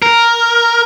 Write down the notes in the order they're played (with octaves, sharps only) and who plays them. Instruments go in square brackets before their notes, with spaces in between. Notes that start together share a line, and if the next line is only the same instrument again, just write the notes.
[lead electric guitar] A#4